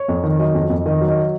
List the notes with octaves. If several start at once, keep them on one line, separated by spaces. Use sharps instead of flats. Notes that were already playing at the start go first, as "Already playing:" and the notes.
Already playing: C#5
F2
D#3
F#3 D#5
F2
F2
D#3 D#5
F#3
D#5